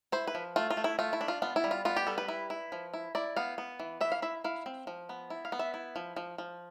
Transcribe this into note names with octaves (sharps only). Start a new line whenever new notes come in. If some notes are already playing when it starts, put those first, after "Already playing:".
E4 C5
B4
F3
A3 F4
F4
A3
E4
A3 F4
E4
D4
F4
B3 F4
E4
G3
F4
B3 F4
G4
G3 A4
B4
E4
E4
F3
E4
E4 D5
B3 F5
B3
E3
E3 E5
F5
E4 E5
E4 F5
C4
F3
B3
E4
F5
B3
E5
E4
F3
F3
F3